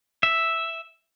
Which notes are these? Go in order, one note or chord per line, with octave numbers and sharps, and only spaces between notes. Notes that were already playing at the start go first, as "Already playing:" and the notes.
E5